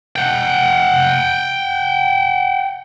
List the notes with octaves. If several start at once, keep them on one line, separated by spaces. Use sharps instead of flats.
F#5 G5